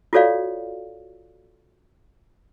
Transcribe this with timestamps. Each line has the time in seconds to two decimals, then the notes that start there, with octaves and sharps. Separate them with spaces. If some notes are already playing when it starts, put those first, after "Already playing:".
0.13 F4 F#4 A4 C#5 D5 F5